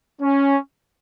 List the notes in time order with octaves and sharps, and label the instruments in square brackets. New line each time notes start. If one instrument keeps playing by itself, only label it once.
[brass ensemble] C#4